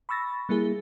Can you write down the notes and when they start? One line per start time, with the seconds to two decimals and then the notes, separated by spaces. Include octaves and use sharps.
0.09 B5 C#6 E6 A6 A#6
0.49 G3 A#3 E4 G#4